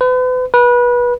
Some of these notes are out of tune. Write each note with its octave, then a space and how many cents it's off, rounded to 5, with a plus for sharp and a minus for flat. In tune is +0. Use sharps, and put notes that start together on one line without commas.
B4 +40
B4 -25